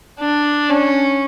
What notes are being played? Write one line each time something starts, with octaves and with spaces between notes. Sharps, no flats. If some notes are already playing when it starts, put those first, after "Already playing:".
D4
C#4